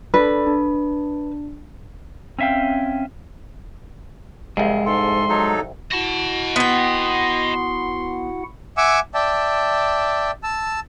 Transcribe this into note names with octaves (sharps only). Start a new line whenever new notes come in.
D4 A4 B4 D5
D4
C4 C#4 E5 F5 G5
C2 F2 G#3
G#2 A4 C6
F#3 D#4 A4
E4 F#4 D#5 F#5 A5
B3 G5 C6
E5 F#5 G#5 D6 E6
D5 E5 G5 A5
A5 E6